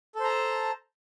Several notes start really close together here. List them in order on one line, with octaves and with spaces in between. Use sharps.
A4 C5 A#5 A5